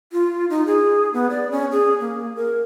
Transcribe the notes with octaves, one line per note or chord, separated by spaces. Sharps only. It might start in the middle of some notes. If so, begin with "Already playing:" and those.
F4
D#4
G#4
B3
D5
C#4
G#4
A#3
A#4